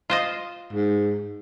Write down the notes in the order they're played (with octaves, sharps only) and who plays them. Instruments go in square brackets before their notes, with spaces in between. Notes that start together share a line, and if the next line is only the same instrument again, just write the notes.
[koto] F4 C5 D#5
[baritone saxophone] G#2